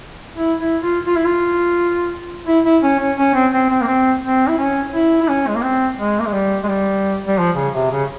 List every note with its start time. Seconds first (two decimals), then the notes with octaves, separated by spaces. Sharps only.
0.36 E4
0.60 E4
0.83 F4
1.07 F4
1.16 E4
1.26 F4
2.47 E4
2.64 E4
2.83 C#4
3.00 C#4
3.17 C#4
3.34 C4
3.53 C4
3.70 C4
3.81 A#3
3.87 C4
4.23 C4
4.48 E4
4.58 C#4
4.93 E4
5.22 E4
5.28 C#4
5.47 G#3
5.55 A#3
5.62 C4
5.99 G#3
6.19 A#3
6.26 G#3
6.33 G3
6.64 G#3
6.69 G3
7.27 G3
7.38 F3
7.56 C#3
7.74 C3
7.91 C#3